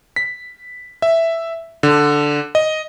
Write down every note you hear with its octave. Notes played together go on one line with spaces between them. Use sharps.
B6
E5
D3
D#5